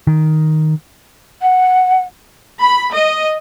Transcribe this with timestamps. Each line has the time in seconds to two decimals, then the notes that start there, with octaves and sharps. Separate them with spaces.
0.07 D#3
1.41 F#5
2.59 B5
2.91 D#5